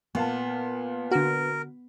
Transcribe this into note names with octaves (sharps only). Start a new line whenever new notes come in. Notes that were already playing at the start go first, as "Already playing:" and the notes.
A#2 B3 F5 A5
D3 F#4 A#4